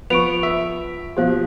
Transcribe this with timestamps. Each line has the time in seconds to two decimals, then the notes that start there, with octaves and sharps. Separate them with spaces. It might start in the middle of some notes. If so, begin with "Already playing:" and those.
0.10 F3 B3 C#6 D7 F7
0.43 E5
1.17 B2 F3 G4 C5 F5